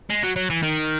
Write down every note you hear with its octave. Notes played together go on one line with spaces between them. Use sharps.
G#3
F#3
F#3
E3
D#3